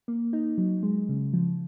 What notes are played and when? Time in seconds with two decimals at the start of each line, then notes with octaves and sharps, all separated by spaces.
0.08 A#3
0.33 D#4
0.58 F#3
0.83 G#3
1.09 C#3
1.33 F3